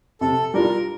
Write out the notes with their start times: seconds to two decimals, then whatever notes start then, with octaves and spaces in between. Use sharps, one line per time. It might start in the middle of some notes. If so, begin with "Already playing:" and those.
0.21 C3 A4
0.54 G3 D4 F4 A#4